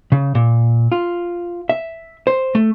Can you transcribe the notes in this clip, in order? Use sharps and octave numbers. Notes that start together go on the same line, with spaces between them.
C#3
A#2
F4
E5
C5
A3